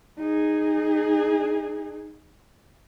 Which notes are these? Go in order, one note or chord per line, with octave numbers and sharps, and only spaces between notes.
D#4 G#4